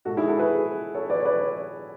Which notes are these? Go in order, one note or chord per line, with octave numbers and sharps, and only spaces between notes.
B2 G#3 F#4 A4
E4 G#4
F#4 A4
G#4 B4
A4 C#5
B4 D5
C#5
B4 D5
C#5